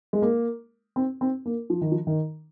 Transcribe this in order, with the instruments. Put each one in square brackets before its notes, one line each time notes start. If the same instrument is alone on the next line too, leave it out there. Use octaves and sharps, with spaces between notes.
[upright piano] G#3
A#3
C4
C4
A#3
F3
D#3
F3
D#3